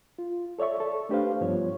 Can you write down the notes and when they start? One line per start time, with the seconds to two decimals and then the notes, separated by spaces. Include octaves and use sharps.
0.19 F4
0.59 A4 C#5 D5 E5 C#6
0.80 A4
1.09 A3 D4 G4 B4 C5 F5
1.41 G2 F3 B3 F4 C#5